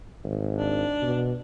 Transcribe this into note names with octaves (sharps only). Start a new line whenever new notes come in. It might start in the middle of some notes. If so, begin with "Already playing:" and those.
G#1
D4
B2